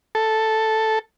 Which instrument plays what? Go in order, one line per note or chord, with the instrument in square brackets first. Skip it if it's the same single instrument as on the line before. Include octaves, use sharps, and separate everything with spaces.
[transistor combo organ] A4